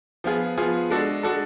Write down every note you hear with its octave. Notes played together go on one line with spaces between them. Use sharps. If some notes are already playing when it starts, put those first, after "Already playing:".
F3 B3 F4 G#4
F3 B3 F4 G#4
G#3 D4 F#4 A4
G#3 D4 F#4 A4